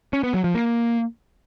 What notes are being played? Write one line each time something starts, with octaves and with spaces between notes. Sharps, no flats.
C#4
B3
F#3
F3
A#3